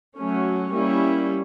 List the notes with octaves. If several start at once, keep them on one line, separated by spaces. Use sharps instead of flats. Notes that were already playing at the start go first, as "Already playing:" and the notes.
F#3 A3 C#4
G3 A#3 C#4 E4